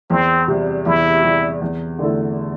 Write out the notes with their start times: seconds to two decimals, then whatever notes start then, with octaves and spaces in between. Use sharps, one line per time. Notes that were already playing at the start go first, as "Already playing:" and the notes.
0.10 E2 C4
0.48 C3 G3
0.86 E2 E4
1.24 C3 G3
1.61 E2
1.99 D3 A3 E4 A4